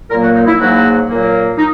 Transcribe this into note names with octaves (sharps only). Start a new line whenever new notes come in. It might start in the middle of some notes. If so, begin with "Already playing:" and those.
A#2 F#3 A#3 A#4
F#4
D#4
E4
G#2 F#3 A#3 F#4
A#2 F#3 A#3
D#4